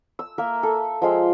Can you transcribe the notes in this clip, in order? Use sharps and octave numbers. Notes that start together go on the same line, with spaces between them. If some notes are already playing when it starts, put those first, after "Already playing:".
E6
A#3 A#4 E5
A4
F3 G#3 F4 G5